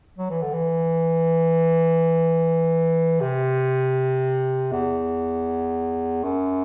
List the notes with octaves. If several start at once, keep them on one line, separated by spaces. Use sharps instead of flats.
F#3
E3
D3
E3
C3
E2
F#2